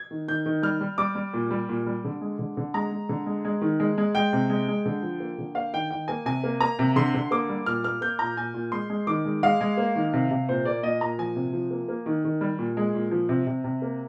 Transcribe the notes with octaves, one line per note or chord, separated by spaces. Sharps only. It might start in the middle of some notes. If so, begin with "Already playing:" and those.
Already playing: G#6
D#3
D#3 G6
D#3
G3 F6
G3
G3 D6
G3
A#2
G3
A#2
G3
D3
G#3
D3
D3
G#3 A#5
G#3
D3
G#3
G#3
D#3
G#3
G#3
G#3 G5
C3
G#3
G#3
D3
F3
A#3
D3
A#3 F5
D#3 G5
D#3 G5
A#3 G#5
C3 G#5
A#3
A#3 A#5
C3
D3 C6
D3
A#3 D6
G3
A#2 F6
A#3 F6
A#3 G6
A#2 A#5
A#2 G#5
A#2
G#3 C6
G#3
D#3 D6
G#3
G#3 F5
G#3
A#3
D#3
C3
C3
A#2 C5
A#3 D5
A#2 D#5
A#2 A#5
F3 G#5
C3
F3
A#3
A#3
D#3
D#3
G3
A#2
G#3
A#2
F3
C3
C3
C3
A#3